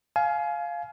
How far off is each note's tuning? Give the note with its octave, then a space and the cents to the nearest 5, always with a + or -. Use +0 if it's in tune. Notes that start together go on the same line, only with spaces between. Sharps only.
F5 +0 G#5 +30